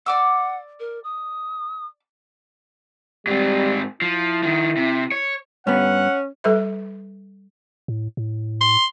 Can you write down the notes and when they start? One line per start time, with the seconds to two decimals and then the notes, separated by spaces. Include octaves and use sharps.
0.06 D5 F#5 D6 E6
0.80 A#4
1.04 D#6
3.27 G#2 G3 C4
4.02 F3 E4
4.43 D#3 F3
4.77 C3
5.12 C#5
5.67 G2 B3 C#4 F#5
6.44 G3 A4 B4 E5
7.88 A2
8.17 A2
8.61 C6